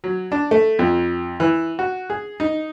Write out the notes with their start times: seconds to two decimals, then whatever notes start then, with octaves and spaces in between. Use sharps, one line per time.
0.04 F#3
0.32 D4
0.51 A3
0.79 F2
1.40 E3
1.79 F#4
2.10 G#4
2.40 D#4